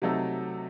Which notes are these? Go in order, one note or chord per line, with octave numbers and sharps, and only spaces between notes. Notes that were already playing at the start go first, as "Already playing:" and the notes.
C3 F#3 A3 D#4 A4